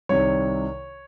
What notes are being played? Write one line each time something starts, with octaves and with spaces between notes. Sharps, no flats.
C2 C3 D#3 C#5